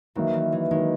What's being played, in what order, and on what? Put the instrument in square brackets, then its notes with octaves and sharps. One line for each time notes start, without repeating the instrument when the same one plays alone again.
[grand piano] D#3 F#3 A#3 D#4 [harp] E3
[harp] E3
E3
[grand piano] D#3 F#3 A#3 D#4 [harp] G#3